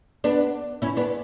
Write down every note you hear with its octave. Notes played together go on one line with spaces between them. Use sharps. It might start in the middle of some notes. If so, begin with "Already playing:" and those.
B3 D4
C#4 E4
B3 D4